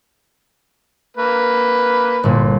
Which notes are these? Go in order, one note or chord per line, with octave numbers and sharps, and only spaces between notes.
A#3 B4
G1 A#2